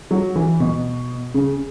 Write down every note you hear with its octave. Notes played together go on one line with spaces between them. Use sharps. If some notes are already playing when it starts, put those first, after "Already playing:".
F#3
E3
B2
C#3